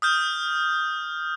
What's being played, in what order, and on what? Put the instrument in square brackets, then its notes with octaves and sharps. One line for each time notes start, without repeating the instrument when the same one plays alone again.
[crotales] D#6 F6 G6